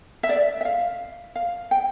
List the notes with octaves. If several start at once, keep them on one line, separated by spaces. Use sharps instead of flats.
E5
D5
E5
F5
F5
G5